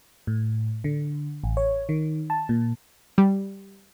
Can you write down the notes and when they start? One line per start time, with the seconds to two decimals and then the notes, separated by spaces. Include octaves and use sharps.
0.27 A2
0.84 D3
1.44 A1
1.57 C#5
1.89 D#3
2.30 A5
2.49 A#2
3.18 G3